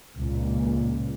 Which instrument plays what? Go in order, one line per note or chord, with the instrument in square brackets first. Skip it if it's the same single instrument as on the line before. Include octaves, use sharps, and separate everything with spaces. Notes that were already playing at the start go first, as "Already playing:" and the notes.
[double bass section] C#2 A#2